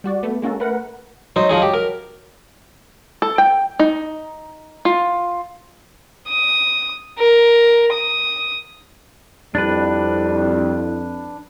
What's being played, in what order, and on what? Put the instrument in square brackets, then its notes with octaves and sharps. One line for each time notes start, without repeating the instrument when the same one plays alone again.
[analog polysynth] G3 F#4 D5
A3 B3
G#3 A#3 C#4 F#4 A4
A3 A#4 B4 F#5
[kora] F#3 [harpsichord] D#4 C5
[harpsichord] F3 D#4 G#4
G4
A#4
[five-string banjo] A4
G5
D#4
F4
[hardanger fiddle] D#6
A#4
D#6
[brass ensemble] F2 [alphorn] G3 [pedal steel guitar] D4 B4 [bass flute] E4